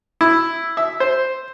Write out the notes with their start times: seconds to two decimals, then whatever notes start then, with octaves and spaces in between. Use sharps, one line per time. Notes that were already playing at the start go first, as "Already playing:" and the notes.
0.21 E4
0.77 E5
1.00 C5